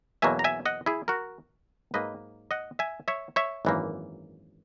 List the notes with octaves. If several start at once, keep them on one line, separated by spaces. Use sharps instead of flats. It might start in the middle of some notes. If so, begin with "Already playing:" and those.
E2 B2 F#3 A#3 E5 G#5
A#5
E5 G#5
D#5 F#5
E4 G#4
F#4 A#4
G#2 F#3 A#3 B4 D#5
D#5 F#5
E5 G#5
C#5 E5
C#5 E5
G#1 F#2 E3 A#3